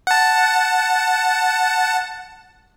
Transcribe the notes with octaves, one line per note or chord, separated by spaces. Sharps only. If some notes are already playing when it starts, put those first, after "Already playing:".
F#5 A5